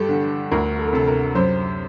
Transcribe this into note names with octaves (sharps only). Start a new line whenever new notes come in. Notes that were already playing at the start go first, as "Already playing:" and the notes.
Already playing: G2 G4 A4
D3
D2 A#4
A4
A#4
C3 A4
A#4
F#2 C5